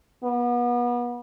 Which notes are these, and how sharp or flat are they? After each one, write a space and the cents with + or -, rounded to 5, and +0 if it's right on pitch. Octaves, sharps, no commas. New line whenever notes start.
B3 -30